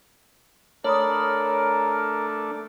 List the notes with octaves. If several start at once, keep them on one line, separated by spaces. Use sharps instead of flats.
A3 D4 A#4 C#5 B5 D#6